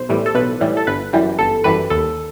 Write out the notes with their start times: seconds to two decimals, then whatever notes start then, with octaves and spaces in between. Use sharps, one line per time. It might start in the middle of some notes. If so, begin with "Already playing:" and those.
Already playing: B1 C5
0.09 A2 E3 G3
0.26 A4
0.35 B1 B4
0.61 A2 E3 G3
0.77 A4
0.87 G1 B4
1.13 F#2 E3 G3
1.39 G1 A4
1.64 F#2 E3 G3 B4
1.90 D#2 A4